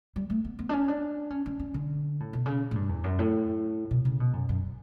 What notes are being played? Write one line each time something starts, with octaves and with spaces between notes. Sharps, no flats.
G3
A3
B3
B3
D4
C#4
D4
C#4
C#4
C#4
D3
A2
B2
C#3
A2
G2
E2
F#2
A2
B2
C#3
B2
F#2
F#2